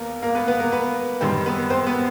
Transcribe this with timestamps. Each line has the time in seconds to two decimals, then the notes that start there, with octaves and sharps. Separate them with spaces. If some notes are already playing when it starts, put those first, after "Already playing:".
Already playing: D#2 A#3 B3 A#4
0.22 A#3 A#4
0.35 B3 B4
0.47 B3 B4
0.60 A#3 A#4
0.72 B3 B4
1.21 F#2 D#3 G3 C4 C5
1.46 B3 B4
1.70 C4 C5
1.87 B3 B4